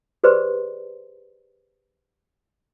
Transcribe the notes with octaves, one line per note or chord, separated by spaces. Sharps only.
G4 G#4 B4 C5 D5 C6